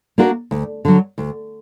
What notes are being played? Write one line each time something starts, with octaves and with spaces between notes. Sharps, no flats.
A#3 D4 F#4 A#4
D2
D3 F#3
D2